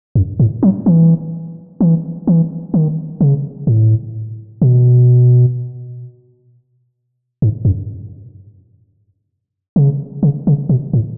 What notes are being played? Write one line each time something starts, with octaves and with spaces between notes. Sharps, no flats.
F#2
A2
F#3
E3
E3
E3
D#3
C#3
A2
B2
G#2
F#2
C#3
C#3
C#3
B2
A2